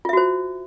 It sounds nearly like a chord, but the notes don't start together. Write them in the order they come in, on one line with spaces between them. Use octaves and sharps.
F4 E5 F#4 C5